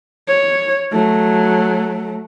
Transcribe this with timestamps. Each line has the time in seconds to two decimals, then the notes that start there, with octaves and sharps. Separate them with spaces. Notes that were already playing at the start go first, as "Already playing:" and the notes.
0.28 C#5
0.92 F#3 A3